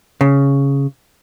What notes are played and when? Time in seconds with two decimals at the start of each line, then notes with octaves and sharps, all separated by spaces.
0.21 C#3